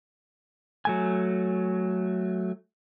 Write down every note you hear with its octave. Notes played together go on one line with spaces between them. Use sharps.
F#3 A3 G#5